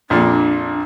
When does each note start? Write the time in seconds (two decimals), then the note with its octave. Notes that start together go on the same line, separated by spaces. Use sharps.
0.10 A#1 F2 A#2 D4